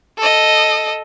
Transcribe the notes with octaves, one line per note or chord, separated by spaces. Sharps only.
A4 D#5